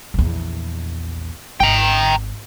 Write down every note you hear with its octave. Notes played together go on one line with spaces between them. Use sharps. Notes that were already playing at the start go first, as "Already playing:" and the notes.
A#1 E2
G#1 G5 A#5